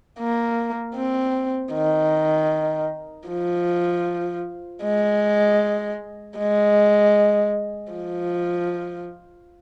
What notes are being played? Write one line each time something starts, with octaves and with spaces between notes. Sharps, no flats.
A#3
C4
D#3
F3
G#3
G#3
F3